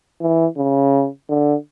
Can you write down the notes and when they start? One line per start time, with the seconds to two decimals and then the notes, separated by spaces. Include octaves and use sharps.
0.21 E3
0.58 C#3
1.30 D3